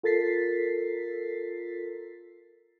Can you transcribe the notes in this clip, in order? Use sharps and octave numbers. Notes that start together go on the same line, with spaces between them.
F4 A4 A#4 A6 B6 C7